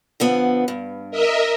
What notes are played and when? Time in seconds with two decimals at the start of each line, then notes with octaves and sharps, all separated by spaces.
0.20 D3 F3 B3
0.68 G2
1.11 A#4 D#5 E5